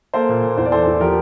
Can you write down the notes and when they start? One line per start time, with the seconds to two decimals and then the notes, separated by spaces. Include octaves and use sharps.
0.14 A#3 A4 C5
0.29 A#2
0.43 A#2
0.57 E2 C5
0.65 D5
0.72 E3 A4 C5
0.87 E2
1.01 F3 G4 A#4